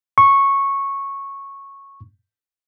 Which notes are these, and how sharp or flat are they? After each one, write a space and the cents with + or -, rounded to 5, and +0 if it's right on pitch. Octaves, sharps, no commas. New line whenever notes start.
C#6 -10